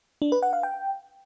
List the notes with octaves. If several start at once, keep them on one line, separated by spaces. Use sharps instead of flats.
D4
B4
F#5
F5
G5